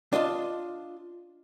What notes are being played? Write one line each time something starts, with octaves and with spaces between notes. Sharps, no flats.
D4 F4 D#5 A5